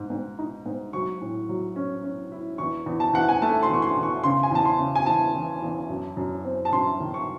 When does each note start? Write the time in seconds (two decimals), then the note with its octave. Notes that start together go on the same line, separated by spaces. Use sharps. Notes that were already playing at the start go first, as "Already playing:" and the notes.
Already playing: G#2
0.10 G#2
0.39 D#4
0.66 G#2
0.93 F#3 C#6
1.21 A2
1.49 F#3
1.76 C#4
2.04 C#4
2.32 E4
2.58 E2 C#6
2.86 E2
3.00 A5
3.13 E2 F#5
3.29 G#5
3.42 A3 A5
3.63 C6
3.70 E2 C#6
3.82 C6
3.97 E2
4.03 C#6
4.23 C#3 C6
4.43 G#5
4.51 E2 A5
4.65 C6
4.80 C#3
4.95 G#5
5.06 E2 A5
5.35 E3
5.62 E2
5.89 F#2
6.17 F#2
6.45 C4
6.65 A5
6.72 F#2 C6
7.00 D#3
7.14 C#6